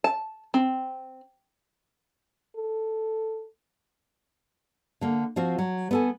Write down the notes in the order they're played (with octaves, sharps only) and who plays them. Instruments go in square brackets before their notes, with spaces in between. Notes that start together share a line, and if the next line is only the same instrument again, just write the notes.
[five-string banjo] A5
C4
[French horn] A4
[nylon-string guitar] D3 A#3
F3 C4 F4 F#4
F#3
B3 A4 G#5